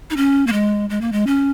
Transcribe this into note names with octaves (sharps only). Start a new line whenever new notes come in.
D#4
C#4
A#3
G#3
G#3
A#3
G#3
C#4